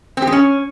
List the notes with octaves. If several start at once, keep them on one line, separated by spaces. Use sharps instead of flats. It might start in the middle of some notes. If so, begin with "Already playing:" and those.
C4
G4
G#3
C#4